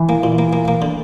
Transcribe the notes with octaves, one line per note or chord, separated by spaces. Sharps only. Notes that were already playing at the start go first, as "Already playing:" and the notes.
Already playing: E3
A#3
A#2
A#3
A#3
A#3
D3